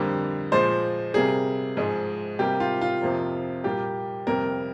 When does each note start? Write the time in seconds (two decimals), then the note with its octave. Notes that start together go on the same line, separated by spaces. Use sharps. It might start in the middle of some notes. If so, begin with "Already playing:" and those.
Already playing: F2 D3 G3 A#3
0.52 A#2 F3 G#3 C5
1.14 C3 G3 A#3 G#4
1.77 G#2 F3 G#3
2.39 C3 G3 A#3 G4
2.60 F4
2.81 F4
3.02 F2 C3 F3 A#3
3.64 A#2 G3 A#3 G4
4.27 F2 C3 G3 A#3 A#4